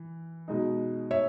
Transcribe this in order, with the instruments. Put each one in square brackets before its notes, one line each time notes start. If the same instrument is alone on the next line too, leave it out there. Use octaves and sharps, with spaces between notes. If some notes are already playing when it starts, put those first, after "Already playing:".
Already playing: [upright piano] E3
B2 G#3 D#4
[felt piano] C#5 E5